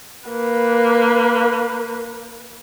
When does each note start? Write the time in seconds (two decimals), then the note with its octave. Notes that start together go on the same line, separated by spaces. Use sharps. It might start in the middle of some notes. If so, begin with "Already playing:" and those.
0.29 A#3 B4